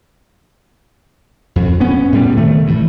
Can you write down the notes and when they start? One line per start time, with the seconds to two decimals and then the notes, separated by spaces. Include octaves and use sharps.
1.56 F2
1.80 B3 C#4
2.12 A2 G3
2.37 C3 D#3 A3
2.67 G2 E3